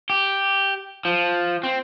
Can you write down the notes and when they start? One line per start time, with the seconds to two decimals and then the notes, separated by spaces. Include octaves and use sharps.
0.10 G4
1.05 F3
1.63 C4